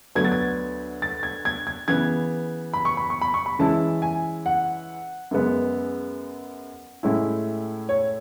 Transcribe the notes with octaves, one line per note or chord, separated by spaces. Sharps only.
D2 D3 F#3 B3 G#6
A6
G#6
A6
G#6
G#6
G#6
C#3 E3 B3 G#6
B5
C#6
B5
C#6
B5
C#6
B5
C#3 E3 G#3 C#4 E4 A5
G#5
F#5
F#2 C#3 G#3 B3
A2 G#3 C#4 E4
C#5